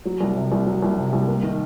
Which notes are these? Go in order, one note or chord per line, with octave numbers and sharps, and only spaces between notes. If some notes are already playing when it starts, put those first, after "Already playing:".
F#3
C2
C3
C2
F#3
C2
C3
C2
A#3
D#3